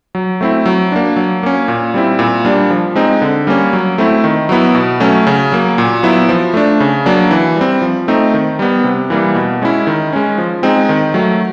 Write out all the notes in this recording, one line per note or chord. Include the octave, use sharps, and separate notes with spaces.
F#3
A3 C4 E4
F#3
A#3 D4
F#3
A#3 C#4
A#2
G3 C4 E4
A#2
G3 A#3 D4
F3
G#3 C4 D#4
D3
G3 A#3 C#4
F#3
A3 C4 E4
D#3
F#3 B3 E4
B2
F#3 A3 C#4
C#3
F#3 A#3
A#2
F#3 B3 E4
F3
A3 D4
C#3
F#3 A#3 D4
E3
G3 C4
F3
A3 C4 D#4
D#3
G3 B3
C3
E3 G3 A#3
B2
G#3 C#4 E4
D#3
G#3 C#4
F3
G#3 C4 D#4
D#3
F#3 A3